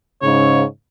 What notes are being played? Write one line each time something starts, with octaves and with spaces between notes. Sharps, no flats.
G#2 C#3 C#5